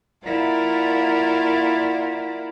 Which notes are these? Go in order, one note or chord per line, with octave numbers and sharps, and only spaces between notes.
A#3 E4 F4 A#4 D5 F#5